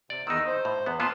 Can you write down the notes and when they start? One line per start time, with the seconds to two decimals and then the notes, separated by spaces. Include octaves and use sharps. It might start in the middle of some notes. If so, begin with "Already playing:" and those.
0.10 C3 D5
0.27 E2 D#3 D#4 E6
0.47 C5
0.65 A2
0.86 E2 B3
1.00 A#2 B3 F4 A5 C6